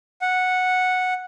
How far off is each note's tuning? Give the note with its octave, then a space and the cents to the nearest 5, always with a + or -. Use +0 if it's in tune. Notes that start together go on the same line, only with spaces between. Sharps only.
F#5 -5